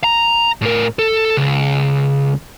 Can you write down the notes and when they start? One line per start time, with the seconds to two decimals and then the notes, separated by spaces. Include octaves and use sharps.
0.04 A#5
0.62 A2 A#4
0.99 A4
1.37 C#2